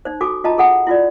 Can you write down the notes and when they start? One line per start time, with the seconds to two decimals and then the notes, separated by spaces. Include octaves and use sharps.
0.05 D#4 C5
0.21 F#4 A4 G#5 D6
0.44 F4 D#5 A5 A#5
0.58 G#4 A4 F#5 G#5
0.87 E4 F4 D5